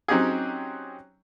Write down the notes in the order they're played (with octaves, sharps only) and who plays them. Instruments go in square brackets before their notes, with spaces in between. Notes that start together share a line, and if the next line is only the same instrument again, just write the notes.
[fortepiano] F#3 C4 C#4 D#4 G4 G#4